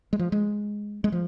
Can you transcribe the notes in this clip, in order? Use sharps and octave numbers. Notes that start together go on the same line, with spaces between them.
G#3
F3
G#3
G#3
F3